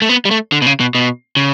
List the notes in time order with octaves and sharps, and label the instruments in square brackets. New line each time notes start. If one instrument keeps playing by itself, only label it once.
[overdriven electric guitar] A3
B3
G3
A3
D3
B2
C#3
B2
B2
C#3